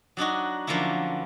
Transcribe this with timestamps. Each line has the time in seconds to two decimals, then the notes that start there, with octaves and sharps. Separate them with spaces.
0.17 F#3 D4 D#4 F#4
0.67 D3 F3 F#3 A#3 C#4 E4